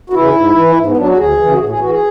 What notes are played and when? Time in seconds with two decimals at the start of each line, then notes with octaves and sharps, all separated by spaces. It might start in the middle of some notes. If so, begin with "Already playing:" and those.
0.10 F#4
0.13 C#3 E3 E4
0.35 G#2
0.55 E3
0.76 G#2
0.87 B3
0.97 F#3 D4
1.07 F#4
1.17 D2 G#4
1.38 C#3 E3
1.51 F#4
1.58 A2 G#4
1.69 G#4
1.79 E3 F#4
1.89 G#4